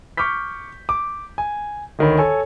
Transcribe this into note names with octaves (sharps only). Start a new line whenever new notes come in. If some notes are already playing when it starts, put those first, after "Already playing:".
C#6 D6 F6 G6 B6
D6
G#5
D2 D#3 C#5 B5
A4 C#5 G#5